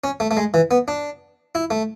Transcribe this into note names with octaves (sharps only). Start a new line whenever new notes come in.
C#4
A3
A3
G#3
E3
B3
D4
E4
A3